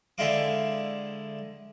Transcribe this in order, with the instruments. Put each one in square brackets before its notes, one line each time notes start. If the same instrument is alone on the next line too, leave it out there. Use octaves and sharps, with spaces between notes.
[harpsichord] D3 G#3 E4 F5 D6